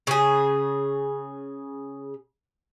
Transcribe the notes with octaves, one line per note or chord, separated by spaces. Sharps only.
C#3 G#4